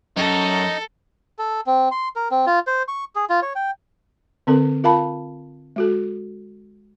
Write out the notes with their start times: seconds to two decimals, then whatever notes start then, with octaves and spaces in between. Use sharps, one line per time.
0.17 F#2 D#4 A4
1.39 A4
1.66 C4
1.91 C6
2.16 A#4
2.31 C4
2.47 F4
2.67 C5
2.88 C#6
3.15 G#4
3.29 F4
3.42 C#5
3.56 G5
4.47 D3 C4 A4 A#4
4.84 F4 A#4 F5 A5 B5
5.76 G#3 F#4 A4